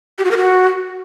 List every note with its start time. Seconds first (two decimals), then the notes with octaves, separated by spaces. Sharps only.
0.18 G4
0.25 F#4
0.31 A#4
0.37 F#4